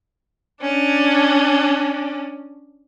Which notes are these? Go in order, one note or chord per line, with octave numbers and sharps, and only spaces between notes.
C#4 D4